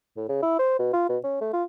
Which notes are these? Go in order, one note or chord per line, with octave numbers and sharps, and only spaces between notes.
A2
C#3
E4
C5
B2
F4
B2
C#4
A3
F4